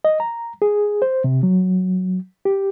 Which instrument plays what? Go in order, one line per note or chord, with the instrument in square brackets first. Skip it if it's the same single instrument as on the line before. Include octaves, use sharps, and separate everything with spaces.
[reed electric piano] D#5
A#5
G#4
C5
C3
F#3
G4